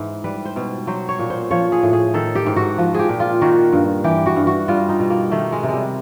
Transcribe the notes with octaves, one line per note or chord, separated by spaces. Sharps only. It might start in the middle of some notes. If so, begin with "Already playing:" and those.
Already playing: G#2 E3
G3 B4
C5
B2
F#3 C5
C#5
A#2
C5
F3 C#5
G#4
A2
G#4
D#3 A4
G4
G#2
F#4
F3
G4 G#4
A#2
F4
D#3 F#4
G2
E3 G4
F#4
G2
F#4
G3 F4
D#4
B2
A#3
D#3 A3
G#3
C3
G3 G#3